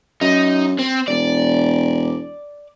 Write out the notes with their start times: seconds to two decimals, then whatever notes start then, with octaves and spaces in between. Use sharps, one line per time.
0.21 F#2 D#4
0.79 C4
1.08 E1 D5